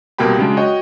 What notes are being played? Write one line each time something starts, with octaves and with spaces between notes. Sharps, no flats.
C2 B2 A#3 G4 G5 B5
C#3 F#3 G#3 D4
F#4 C#5 D#5 G5